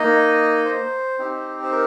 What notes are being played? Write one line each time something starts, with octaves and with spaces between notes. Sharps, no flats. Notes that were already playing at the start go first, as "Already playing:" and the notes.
Already playing: A#3 D#4 D#5
C5
C4 D#4 G4
C5
A#4